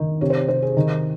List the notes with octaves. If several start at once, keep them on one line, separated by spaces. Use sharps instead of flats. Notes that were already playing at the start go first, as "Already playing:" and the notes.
Already playing: D#3
C3 C#5
C5
C#5
C3 C5
G#4
D#3